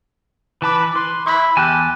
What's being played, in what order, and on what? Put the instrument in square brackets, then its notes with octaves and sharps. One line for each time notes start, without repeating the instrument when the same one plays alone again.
[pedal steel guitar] E3 A5 D6 [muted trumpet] B4
[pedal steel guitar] B4 [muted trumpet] C6
[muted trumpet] E4 [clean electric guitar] B5 C6
[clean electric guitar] E2 [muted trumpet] G4 [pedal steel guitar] G#5 A5 F#6